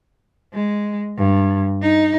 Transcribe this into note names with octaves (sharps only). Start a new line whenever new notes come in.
G#3
G2
D#4